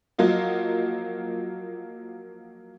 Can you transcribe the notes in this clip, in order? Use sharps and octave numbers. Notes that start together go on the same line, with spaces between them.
F3 F#3 A#3 F4 D#5